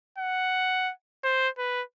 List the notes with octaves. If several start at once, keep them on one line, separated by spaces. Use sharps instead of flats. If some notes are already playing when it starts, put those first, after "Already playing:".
F#5
C5
B4